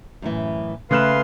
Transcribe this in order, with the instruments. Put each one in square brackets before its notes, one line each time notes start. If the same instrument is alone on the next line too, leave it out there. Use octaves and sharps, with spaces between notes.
[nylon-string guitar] F#2 A2 E3
[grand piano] C#3 F#6 E7 [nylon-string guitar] A3 [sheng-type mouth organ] B4 F5 C6